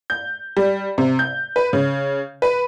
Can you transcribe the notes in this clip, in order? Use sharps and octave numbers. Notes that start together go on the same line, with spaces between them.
G6
G3
C3
G6
B4
C#3
B4